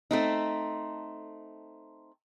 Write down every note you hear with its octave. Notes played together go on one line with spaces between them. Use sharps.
A3 C4 D#4